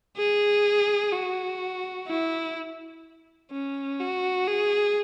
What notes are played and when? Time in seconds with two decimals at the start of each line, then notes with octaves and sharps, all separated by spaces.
0.17 G#4
1.13 F#4
2.08 E4
3.51 C#4
4.00 F#4
4.47 G#4